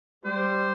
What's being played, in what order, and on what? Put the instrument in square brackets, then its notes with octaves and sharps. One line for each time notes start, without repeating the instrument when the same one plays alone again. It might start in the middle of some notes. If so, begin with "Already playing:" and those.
[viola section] G3 [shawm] C5